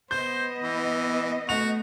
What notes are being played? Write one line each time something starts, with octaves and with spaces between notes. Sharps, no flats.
B3 C5 D#5 G6
E3
A3 F#4 F7